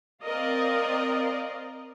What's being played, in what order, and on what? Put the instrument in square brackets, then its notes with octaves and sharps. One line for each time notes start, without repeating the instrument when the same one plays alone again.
[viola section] C4 A#4 D5 D#5 F5